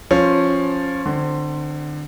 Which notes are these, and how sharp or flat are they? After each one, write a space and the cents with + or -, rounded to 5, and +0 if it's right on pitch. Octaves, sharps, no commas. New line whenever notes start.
F3 +5 C#4 -10 C5 +5
D3 +25 C4 +0